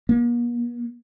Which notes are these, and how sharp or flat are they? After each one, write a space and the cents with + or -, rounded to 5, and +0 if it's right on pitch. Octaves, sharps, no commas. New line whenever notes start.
A#3 +45